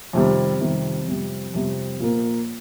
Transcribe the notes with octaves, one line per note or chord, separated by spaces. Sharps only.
F2 C3 D#3 G3
F2 C3 D#3 G3
F2 C3 G3
F2 C3 G3
A#2 F3 A#3